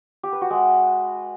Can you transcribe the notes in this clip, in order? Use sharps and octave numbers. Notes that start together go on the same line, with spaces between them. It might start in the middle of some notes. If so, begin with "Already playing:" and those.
G4
B4
F#4
G#3